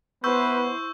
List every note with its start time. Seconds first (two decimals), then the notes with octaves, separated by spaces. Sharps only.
0.24 B3 E4 B4 C5 C#6 E6 G6